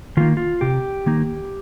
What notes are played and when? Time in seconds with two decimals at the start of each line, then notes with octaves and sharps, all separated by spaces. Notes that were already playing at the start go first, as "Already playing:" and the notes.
0.17 D#3 A#3 D#4 F4
0.37 F4
0.61 C3 G4
1.06 D#3 A#3 D#4